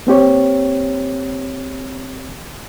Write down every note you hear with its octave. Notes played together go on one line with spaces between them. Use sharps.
A#3 C4 G4 C#5